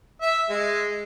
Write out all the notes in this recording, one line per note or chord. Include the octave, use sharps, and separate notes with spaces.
E5
G#3